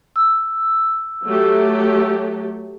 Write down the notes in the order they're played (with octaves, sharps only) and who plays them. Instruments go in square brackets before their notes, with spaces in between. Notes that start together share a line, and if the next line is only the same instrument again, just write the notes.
[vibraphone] E6
[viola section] F#3 A3 G4